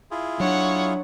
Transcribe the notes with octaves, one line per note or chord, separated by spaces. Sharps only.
E4 F4 G#4
F#3 D4 C#5 F#5